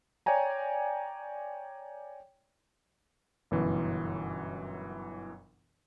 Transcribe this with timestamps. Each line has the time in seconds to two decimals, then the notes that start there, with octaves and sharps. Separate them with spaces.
0.26 C#5 D5 G5 G#5 A#5
3.51 G1 F#2 B2 E3